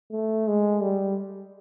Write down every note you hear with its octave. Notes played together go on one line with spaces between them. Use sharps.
A3
G#3
G3